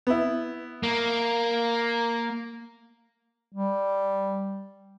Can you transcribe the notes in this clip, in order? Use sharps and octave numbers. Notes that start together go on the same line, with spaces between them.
B3 E4
A#3
G3